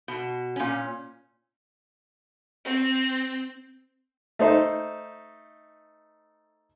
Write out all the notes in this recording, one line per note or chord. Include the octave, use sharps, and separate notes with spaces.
B2
A#2 C#4
C4
A3 D#4 C5